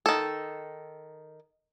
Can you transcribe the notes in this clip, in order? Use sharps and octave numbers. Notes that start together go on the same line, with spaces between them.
D#3 A4